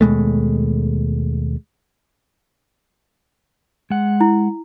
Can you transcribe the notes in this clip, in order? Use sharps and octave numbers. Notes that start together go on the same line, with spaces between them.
D#2 B2 G#3 A3
G#3 F#5
E4